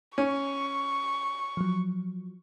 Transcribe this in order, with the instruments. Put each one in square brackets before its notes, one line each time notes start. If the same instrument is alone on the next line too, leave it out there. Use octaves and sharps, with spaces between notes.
[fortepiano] C#4 [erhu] C#6
[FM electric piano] F3 F#3